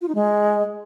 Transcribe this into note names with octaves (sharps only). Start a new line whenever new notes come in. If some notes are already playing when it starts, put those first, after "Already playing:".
F4
D#4
G#3